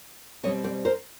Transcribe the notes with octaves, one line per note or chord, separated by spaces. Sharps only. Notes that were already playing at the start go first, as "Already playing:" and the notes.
B2 G3 C4 C#5 D#5
C5 D5
A#4 C5